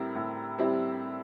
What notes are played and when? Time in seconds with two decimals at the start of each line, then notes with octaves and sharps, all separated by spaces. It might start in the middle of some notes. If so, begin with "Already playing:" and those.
Already playing: A2 G3 C4 E4 A#4
0.15 A2
0.58 G3 C4 E4